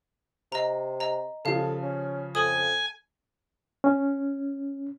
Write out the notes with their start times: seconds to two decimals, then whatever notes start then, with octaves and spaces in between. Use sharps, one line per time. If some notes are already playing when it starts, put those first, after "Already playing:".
0.52 C3 D#5 A#5
1.00 D#5 A#5
1.45 C#3 F3 G4 A4 F5
1.83 C#4
2.35 F2 A4 G#5 D#6
3.84 C#4